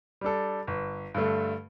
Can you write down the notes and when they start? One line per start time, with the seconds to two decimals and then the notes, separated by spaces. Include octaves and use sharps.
0.21 G3 D4 A4
0.67 G1
1.14 G2 D3 A3